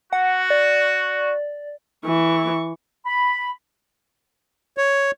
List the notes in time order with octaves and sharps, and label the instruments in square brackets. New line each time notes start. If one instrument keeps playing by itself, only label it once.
[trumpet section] F#4 [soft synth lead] F#5
[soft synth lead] D5
[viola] E3 C#6
[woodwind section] B5
[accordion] C#5